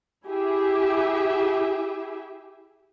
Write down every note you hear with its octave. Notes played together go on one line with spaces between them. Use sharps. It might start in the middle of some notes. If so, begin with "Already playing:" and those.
E4 G4 G#4 E5